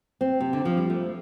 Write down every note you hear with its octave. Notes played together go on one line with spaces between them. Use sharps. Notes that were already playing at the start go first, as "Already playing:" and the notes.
C4
C3
D3
F3
G3
A3